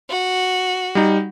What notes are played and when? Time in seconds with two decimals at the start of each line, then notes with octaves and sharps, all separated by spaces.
0.10 F#4
0.95 G3 D#4